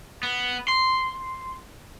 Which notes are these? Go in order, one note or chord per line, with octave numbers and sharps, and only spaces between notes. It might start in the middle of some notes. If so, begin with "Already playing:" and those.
B3
C6